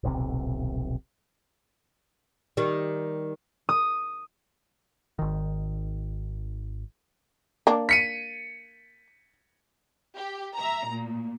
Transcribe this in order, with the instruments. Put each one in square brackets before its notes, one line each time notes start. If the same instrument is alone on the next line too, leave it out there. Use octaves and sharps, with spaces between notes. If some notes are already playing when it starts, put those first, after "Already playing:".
[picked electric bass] D#1 B1 C3
[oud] D#3 G3
[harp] D#6
[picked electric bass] G#1 D#3
[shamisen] A#3 D4
[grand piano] B6 C#7 D#7
[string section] G4
E5 A#5
A#2